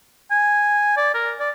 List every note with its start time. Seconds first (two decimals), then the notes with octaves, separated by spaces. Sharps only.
0.31 G#5
0.97 D5
1.14 A#4
1.39 D5